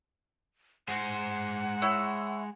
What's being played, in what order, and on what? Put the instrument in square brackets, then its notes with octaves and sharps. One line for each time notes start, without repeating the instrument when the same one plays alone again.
[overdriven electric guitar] G#3 C5 [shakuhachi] F#5
[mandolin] E4 C#5 E6